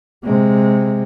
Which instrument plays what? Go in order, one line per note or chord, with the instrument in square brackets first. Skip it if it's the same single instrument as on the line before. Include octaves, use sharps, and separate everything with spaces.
[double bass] C3 G#3